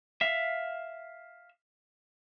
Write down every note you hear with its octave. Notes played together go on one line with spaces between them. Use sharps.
E5 F5